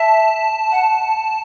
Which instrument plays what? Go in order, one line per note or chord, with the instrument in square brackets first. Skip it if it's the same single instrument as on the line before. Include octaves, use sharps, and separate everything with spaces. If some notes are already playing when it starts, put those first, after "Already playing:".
Already playing: [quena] E5 [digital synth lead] A5
[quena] F#5